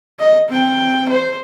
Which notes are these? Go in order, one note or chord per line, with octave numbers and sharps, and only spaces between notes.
D#5
C4 G5
C5